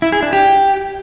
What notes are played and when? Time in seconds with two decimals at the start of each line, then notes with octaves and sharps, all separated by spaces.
0.02 E4
0.12 G#4
0.23 D4
0.33 G4